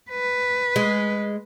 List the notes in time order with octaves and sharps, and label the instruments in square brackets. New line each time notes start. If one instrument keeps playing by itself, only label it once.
[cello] B4
[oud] G#3